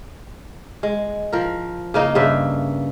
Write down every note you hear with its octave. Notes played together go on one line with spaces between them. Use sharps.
G#3
F3 A#4
C#3 A#3 D#4
G2 C#3 E5